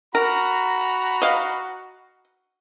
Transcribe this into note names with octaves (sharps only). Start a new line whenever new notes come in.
F#4 A#4 A#5 B5
D#5 F5